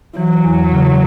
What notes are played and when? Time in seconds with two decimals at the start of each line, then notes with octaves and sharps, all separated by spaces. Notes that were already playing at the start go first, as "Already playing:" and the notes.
0.17 E3 F#3
0.44 E2
0.72 C#3